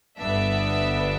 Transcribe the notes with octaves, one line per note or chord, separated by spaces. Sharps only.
G1 G2 D3 B3 D4 E5